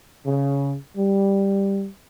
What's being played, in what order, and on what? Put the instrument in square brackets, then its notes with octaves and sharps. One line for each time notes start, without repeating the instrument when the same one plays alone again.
[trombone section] C#3
G3